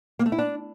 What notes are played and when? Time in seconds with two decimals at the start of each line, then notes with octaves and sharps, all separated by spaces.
0.19 A#3
0.26 A3
0.32 E4
0.38 D4